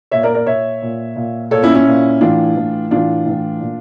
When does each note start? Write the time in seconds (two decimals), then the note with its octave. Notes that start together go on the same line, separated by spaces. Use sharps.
0.11 A#2 C#5 E5
0.23 A#4 D5
0.34 A#4 D5
0.46 A#2 C#5 E5
0.82 A#2
1.16 A#2
1.51 A#2 A4 C#5
1.63 C#4 E4
1.75 C#4 E4
1.87 A#2
2.21 A2 E3 D4 F4
2.56 A2 E3
2.91 A2 E3 D4 F4
3.26 A2 E3
3.61 A#2